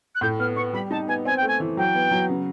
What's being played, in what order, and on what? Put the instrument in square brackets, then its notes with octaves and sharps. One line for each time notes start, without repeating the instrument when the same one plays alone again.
[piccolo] F#6
[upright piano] A2 [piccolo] G6
[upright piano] B3 [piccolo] F6
[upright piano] B3 [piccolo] C#6
[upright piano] G3 [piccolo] B5
[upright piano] D#4 [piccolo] A5
[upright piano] B3 [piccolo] G#5
[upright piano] C4 [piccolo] G#5
[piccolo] G5
[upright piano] A3 [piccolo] G#5
[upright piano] E3
[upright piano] F#3 [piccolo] G5
[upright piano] B3
F#3
C#3